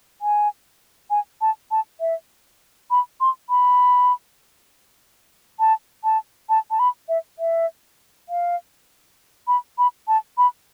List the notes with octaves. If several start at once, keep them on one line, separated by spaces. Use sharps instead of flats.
G#5
G#5
A5
A5
E5
B5
C6
B5
A5
A5
A5
A5
B5
E5
E5
F5
B5
B5
A5
B5